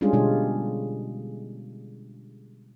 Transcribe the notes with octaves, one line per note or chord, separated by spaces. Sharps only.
G3 G#3 C#4 D4 F4 G#4
B2 D3 G3 G#3 F4